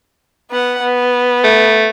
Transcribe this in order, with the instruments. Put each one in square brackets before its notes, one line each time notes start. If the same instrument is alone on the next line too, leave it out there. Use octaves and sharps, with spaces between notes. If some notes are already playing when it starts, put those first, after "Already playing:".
[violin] B3 F#5
B3
[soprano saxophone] A3